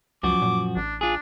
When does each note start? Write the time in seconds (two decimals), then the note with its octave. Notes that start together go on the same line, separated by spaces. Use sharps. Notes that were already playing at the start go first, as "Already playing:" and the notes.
0.23 C#2 F#2 F3 F#4 D6
0.42 A#2
0.76 A1 D4
1.01 D4 F4 G#4